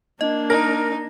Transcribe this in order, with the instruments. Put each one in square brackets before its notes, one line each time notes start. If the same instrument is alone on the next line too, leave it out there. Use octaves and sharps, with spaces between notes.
[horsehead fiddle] A#3 D4 [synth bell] D#5
[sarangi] D#4 [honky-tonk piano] A#4 [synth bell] A#6